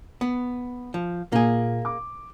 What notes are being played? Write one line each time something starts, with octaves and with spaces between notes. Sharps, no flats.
B3
F3
A#2 A#3 G#4
D6